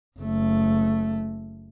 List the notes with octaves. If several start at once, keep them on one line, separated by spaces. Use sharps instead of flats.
F#1 A3